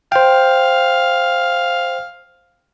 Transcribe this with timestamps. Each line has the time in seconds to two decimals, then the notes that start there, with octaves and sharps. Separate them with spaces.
0.12 C5 F5 G5